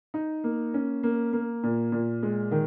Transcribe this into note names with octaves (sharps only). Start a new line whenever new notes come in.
D#4
A#3
C#4
A#3
A#3
A#2
A#2
G#3
D#3